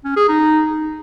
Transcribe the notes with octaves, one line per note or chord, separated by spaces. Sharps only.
C#4
G#4
D#4